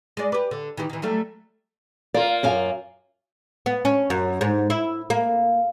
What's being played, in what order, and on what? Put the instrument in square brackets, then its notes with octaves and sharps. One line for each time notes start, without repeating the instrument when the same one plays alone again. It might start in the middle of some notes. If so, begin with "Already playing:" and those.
[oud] G#3 D5
G4 B4
D3
D#3 E3 G4
D#3 E3
F#3 G3 A3
[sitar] A#3 F4 [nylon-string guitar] D5
[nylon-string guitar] F#2 F5 G#5
[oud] B3
C#4
F#2
G#2
E4
A#3